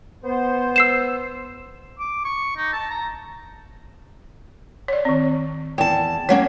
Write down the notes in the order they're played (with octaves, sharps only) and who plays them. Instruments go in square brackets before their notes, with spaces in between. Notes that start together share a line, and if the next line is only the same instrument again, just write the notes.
[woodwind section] B3 C5
[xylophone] E6 C7 E7
[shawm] D6
C#6
D#4
A5
A#5
[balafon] C#5 D5
D#3 C4
[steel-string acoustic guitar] E2 A5 [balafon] G5
[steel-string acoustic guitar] F#3 A#3 C#4 [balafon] C#5 F#5